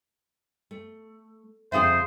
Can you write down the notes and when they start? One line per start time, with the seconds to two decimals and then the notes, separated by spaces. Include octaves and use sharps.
0.71 A3
1.72 F2 C#3 G#4 C5 E5 F5 D#6